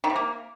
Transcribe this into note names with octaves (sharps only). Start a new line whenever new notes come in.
D#3
C3
A#3